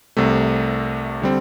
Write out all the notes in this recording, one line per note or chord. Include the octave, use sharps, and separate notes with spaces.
C2 C3 A3
D3 G3 C4